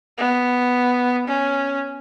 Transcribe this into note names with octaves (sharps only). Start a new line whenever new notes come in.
B3
C#4